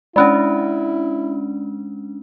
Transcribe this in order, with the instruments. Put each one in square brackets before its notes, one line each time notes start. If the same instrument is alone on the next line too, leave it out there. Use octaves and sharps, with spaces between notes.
[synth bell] G#3 C#4 D4 [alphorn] E4 [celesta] D5 B5 F#6